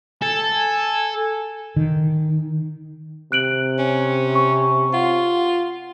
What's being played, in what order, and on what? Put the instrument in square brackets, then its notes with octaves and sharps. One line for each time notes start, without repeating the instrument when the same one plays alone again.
[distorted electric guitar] A4 [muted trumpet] G#5
[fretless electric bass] D#3
[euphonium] C3 [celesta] F#6 D7 F#7
[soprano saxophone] C#4
[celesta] C#6
[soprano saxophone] F4 [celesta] F#5